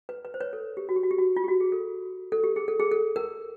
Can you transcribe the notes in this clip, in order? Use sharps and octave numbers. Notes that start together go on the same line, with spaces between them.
B4
B4
C5
B4 C#5
A4
G4
F#4
G4
F#4
G4
F#4
F4
G4
F#4
G#4
A4
A4
G4
G#4
A4
G#4
A4
A#4